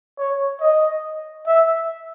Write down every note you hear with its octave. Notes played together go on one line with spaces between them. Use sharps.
C#5
D#5
E5